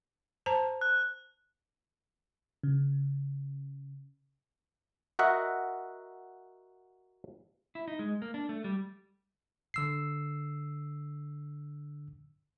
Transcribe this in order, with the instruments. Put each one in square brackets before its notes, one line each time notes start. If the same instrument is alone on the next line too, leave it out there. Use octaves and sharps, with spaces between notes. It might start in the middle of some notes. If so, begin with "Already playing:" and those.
[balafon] C5 A5 A#5
[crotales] F#6
[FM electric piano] C#3
[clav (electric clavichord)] F#4 A#4 D#5 E5 F#5
[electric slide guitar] E4
D#4
G#3
A#3
D4
A3
G3
[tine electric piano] D3 E6 C7